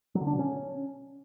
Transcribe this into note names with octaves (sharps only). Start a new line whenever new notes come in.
F#3
D3
D4
B2
C#4